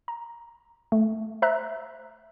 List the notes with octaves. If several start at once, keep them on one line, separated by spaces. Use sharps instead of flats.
A#5
A3
C5 E5 A#5 F#6